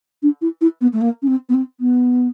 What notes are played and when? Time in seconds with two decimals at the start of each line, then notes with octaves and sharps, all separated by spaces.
0.23 D4
0.42 E4
0.61 E4
0.81 B3
0.93 A3
1.01 A#3
1.22 C#4
1.27 C4
1.49 B3
1.54 C4
1.80 B3